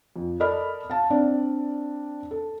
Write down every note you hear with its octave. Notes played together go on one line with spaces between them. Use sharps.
F2
A4 A#4 D5 D#5 B5 F6
F5 A5
C4 D4 D5
A4